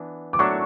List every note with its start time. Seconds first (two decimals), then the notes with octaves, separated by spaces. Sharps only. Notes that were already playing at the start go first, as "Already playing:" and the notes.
Already playing: E3 B3 D4
0.33 D6
0.39 F#3 A3 D4 A4 C#6